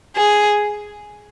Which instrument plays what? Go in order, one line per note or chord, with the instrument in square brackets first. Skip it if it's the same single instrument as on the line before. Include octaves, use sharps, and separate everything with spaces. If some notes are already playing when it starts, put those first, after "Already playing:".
[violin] G#4